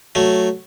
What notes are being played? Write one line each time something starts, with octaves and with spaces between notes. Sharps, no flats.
F#3 A3